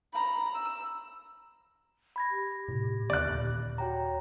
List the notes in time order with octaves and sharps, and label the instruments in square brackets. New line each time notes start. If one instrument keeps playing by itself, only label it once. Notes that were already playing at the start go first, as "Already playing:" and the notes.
[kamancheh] A#5 B5
E6
[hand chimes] B5 G#6 A#6
[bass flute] G4
[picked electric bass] A2 C3
[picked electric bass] D#2 D3 B3 [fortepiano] D5 F#6
[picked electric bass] D#2 A#2
[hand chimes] F#4 G5 A#5 [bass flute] C#5